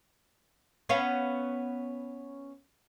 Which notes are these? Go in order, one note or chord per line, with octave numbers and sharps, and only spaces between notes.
B3 C#4 F5